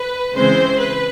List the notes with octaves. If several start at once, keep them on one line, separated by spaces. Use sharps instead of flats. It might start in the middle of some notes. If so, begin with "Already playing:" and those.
Already playing: B4
C#3 E3 G#3 C4 C5
B4